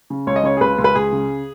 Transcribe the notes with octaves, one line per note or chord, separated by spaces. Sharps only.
C#3
C#2 C#5
D#5
C#3 C#5
G#4
C#2 B4
C#2
B4
C#2 G#4
C#3